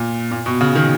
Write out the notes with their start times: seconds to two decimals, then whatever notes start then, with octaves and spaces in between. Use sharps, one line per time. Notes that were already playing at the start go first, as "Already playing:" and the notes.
Already playing: A#2
0.31 A#2
0.46 B2
0.61 C#3
0.75 D#3